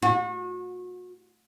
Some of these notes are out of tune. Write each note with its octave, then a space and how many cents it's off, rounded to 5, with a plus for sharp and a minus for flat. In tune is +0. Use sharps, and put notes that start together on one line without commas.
F#4 -35